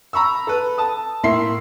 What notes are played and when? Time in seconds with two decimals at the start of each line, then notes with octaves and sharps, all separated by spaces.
0.13 A#5 B5 C#6 E6
0.47 A4 B4
0.78 A5 D#6
1.23 A2 A#3 E5 C6 C7